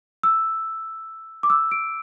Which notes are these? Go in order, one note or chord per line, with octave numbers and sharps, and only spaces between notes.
E6
D6
E6
D7